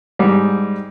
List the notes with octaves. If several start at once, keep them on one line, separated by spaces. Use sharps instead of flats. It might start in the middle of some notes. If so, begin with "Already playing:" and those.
G#2 G3